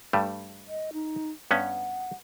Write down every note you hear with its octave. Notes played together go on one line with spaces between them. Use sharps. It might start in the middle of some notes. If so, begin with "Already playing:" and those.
G2 G3 A3
D#5
D#4
G2 B3 C#4 F#5